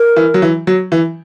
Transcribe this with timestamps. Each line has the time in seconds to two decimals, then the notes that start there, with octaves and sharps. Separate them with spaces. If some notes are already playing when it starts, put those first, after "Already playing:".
Already playing: A#4
0.16 E3
0.34 F#3
0.42 E3
0.67 F#3
0.92 E3